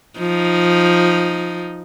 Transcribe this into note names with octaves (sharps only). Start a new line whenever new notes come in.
F3 D#4